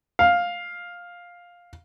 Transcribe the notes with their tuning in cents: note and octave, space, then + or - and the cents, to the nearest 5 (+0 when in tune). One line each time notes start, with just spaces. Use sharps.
F5 +10